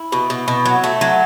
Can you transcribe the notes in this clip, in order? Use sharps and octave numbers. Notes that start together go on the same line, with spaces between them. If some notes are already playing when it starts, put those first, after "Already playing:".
Already playing: E4
B2
B2
B2
F#3
A3
F#3